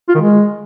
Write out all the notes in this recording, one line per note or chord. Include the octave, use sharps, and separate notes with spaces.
F4
D#3
G#3